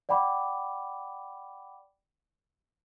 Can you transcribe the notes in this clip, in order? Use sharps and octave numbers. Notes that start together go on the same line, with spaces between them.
D5 F#5 G5 B5 D6